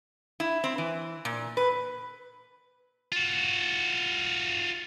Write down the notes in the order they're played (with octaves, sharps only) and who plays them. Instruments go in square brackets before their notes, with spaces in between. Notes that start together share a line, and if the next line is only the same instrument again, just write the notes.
[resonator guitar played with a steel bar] E4
C4
E3
A#2
B4
[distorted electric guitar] F4 F#4